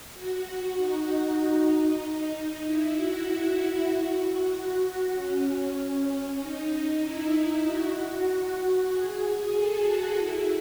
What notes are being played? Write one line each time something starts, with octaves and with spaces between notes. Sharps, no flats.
F#4
D#4
D#4
E4
F#4
F#4
F#4
F#4
C#4
D#4
E4
F#4
G#4
A4
F#4
E4